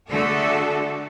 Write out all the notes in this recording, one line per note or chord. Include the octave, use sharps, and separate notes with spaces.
D3 A3 F#4 G#4 A4